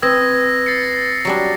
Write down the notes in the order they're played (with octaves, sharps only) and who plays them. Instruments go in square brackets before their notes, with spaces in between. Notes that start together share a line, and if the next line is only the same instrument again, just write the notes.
[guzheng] C4 [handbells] B4 D#6 G#6 [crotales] E6 A#6
[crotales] A6 C7 C#7
[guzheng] F#3 G3 D4